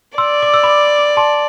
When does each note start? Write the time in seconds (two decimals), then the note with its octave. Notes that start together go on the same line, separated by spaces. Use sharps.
0.18 D5 C6 E6
0.42 D6
0.54 E6
0.63 B5 D6
1.17 A5 C6